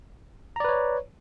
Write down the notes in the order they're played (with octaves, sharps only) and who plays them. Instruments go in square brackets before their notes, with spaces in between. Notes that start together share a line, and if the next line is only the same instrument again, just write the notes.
[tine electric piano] A#5
D5
B4
C#5